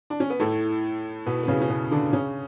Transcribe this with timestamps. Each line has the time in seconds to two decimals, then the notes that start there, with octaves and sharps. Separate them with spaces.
0.10 D4
0.20 C#4
0.30 B3
0.40 A2 A3
1.26 B2 B3
1.43 B3
1.48 C#3 C#4
1.61 C#4
1.70 B2 B3
1.91 D3 D4
2.13 C#3 C#4